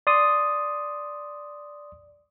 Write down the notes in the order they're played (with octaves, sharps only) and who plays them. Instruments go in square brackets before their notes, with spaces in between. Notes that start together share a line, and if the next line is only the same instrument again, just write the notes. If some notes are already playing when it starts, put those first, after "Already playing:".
[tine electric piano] D5 C6 D#6